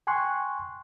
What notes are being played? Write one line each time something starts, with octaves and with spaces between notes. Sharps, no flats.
G5 G#5 C6 C#6 F#6